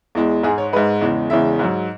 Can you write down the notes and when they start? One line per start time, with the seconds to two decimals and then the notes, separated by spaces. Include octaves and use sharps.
0.15 E2 E3 G#3
0.43 G#2 G#3 G#4
0.58 C#5
0.73 G#2 G#3 B4
1.01 E2 C#3 E3 G#3
1.30 E2 C#3 E3 G#3 E5
1.59 G#2 F#3